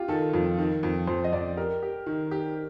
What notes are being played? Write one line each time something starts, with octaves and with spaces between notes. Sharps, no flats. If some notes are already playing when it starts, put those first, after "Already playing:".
Already playing: F4 G4
D#3 A4
F2
D#3
F2
F2 C5
D#5
F2 D5
G4 A#4
G4
D#3
G4